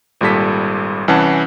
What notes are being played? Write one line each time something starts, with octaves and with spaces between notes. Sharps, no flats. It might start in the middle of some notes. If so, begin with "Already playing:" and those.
G#1 A#2 G3 A4 B6
C2 E3 C#4 F#5 A5